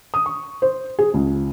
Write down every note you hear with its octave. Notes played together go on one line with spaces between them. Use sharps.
D#6
C#6
C5
G#4
C#2